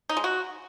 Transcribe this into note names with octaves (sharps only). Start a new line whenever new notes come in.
D#4
G#3
F#4